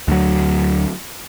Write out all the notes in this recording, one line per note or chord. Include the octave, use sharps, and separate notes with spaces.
D2 F#3